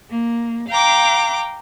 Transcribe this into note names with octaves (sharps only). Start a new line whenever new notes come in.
A#3
F5 G5 A#5 D6